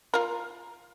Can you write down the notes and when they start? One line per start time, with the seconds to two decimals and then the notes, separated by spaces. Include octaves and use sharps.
0.14 F4 A#4